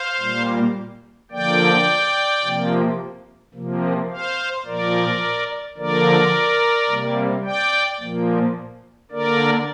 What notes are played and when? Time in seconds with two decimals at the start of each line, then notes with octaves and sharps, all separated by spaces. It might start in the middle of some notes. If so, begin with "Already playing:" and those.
Already playing: C5 F5
0.20 A#2 G3 A#3
1.31 D3 F3 A#3 D5 G5
2.43 C3 F3 A#3
3.54 C3 F3 A#3
4.10 C5 F5
4.66 A#2 F3 A#3 A#4 D5
5.77 D3 F3 A#3 A#4 D5
6.89 C3 G3 A#3
7.44 D5 G5
8.00 A#2 F3 A#3
9.11 D3 A#3 A#4 D5